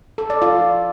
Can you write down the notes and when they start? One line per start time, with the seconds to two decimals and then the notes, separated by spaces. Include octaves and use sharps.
0.18 A4
0.30 D5
0.42 F4